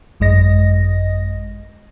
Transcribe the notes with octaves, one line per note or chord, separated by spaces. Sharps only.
G#1 F#2 G#3 D#5 A#6